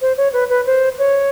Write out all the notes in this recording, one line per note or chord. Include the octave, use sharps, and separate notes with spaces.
C5
C#5
B4
B4
C5
C#5